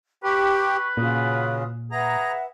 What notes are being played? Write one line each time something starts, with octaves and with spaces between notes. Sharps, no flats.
G4 B4 C#6
A#2 C#3 F4 F#4 D#6
G#4 B4 E5 F#5 A#5